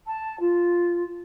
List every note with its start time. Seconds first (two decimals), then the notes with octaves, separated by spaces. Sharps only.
0.06 A5
0.40 F4